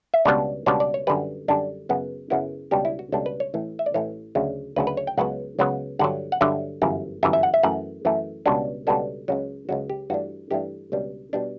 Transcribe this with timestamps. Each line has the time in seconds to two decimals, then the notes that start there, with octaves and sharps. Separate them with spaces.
0.14 E5
0.25 C#2 B2 G3 B3 D4 D5
0.66 C#2 B2 G3 B3 D4 C#5
0.80 D5
0.94 C#5
1.07 F#2 D3 G3 B4
1.48 F#2 D3 G3 D4
1.89 F#2 C#3 F#3 B3
2.30 F#2 C#3 F#3 B3 E4
2.71 C#2 B2 G3 D4 G4
2.85 E4
2.99 F#4
3.12 C#2 B2 G3 D4 A4
3.26 B4
3.40 C#5
3.54 A1 A2 E3
3.79 E5
3.86 D5
3.94 A1 A2 E3 C#5
4.35 D2 C#3 F#3
4.76 D2 C#3 F#3 B4
4.87 B4
4.97 C#5
5.07 G5
5.18 C#2 C#3 F#3 B3 F#5
5.59 C#2 C#3 F#3 B3
5.99 G2 D3 F#3 F#5
6.32 F#5
6.41 G2 D3 F#3 E5
6.82 G1 F#2 E3
7.23 G1 F#2 E3 E5
7.33 E5
7.43 F#5
7.54 E5
7.63 F#2 E3 A3 F#5
8.05 F#2 E3 A3
8.46 C#2 B2 G3 B3 D4
8.87 C#2 B2 G3 B3 D4 A4
9.28 C#2 C#3 F#3
9.69 C#2 C#3 F#3 F#4
9.90 G4
10.10 G2 E3 A3 D4 F#4
10.51 G2 E3 A3 D4 G4
10.92 C#2 B2 G3 D4
11.33 B2 G3 D4